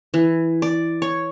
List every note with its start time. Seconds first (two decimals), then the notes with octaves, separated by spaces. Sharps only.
0.14 E3
0.62 D5
1.02 C#5